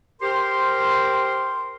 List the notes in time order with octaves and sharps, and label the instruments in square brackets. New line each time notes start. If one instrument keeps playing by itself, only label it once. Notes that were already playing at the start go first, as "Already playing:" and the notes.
[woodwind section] G4 A#4 C5 C6